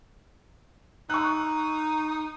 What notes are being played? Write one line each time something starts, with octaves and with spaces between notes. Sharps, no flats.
D#4 C#6 E6 F#6